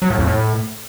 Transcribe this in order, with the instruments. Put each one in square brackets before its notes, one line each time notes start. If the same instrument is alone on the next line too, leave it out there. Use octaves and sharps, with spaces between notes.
[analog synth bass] F#3
A2
F2
A2